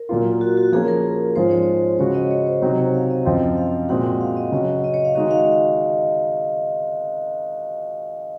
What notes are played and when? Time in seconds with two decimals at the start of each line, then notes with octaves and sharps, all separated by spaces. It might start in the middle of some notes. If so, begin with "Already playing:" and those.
Already playing: A#4
0.09 A#2 F#3 A#3 F4
0.41 F#4
0.57 F#4
0.72 F3 A#3 C#4 G#4
0.88 A#4
1.36 G#2 F3 G#3 C#4 F4 C5
1.51 C#5
1.99 C#3 G#3 C#4 F#4 C#5
2.14 D#5
2.31 C#5
2.47 C5
2.62 C3 F#3 C4 D#4 F#4 C5
2.78 C#5
2.94 F5
3.10 D#5
3.25 F#2 F3 C4 F4
3.57 F5
3.88 A#2 G#3 C4 F#4 F#5
4.21 F5
4.37 D#5
4.51 C#3 F#3 C#4 F#4
4.84 D#5
4.94 C#5
5.05 F5
5.15 D#3 G#3 D#4 F#4 D#5
5.31 F5